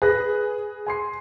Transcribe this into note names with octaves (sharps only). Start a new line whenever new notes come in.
G#4 B4 F#6 A#6
G#5 C6 C7